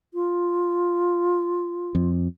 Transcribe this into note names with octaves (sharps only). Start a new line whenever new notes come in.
F4
F2